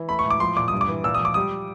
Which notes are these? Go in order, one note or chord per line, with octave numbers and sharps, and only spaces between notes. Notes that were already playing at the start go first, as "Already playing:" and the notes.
Already playing: E3
A3 B5
C#6
A2
D6
F3 C6
A#2 D6
G2 D#6
D6
E3
A#2 E6
D#6
F3 D6
G3 D#6